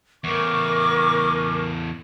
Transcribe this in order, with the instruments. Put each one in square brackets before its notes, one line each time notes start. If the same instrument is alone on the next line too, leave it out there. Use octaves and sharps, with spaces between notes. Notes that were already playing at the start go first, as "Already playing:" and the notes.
[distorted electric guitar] E2 A2 [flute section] A#4 C#6 D6